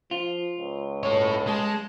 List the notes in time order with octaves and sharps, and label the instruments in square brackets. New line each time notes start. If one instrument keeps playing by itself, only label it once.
[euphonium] F3 [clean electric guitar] F4
[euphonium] C#2
[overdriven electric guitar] A4 C#5
[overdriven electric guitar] G#3 [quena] A5